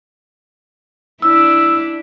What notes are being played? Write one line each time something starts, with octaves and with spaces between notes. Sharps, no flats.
D4 E4 E6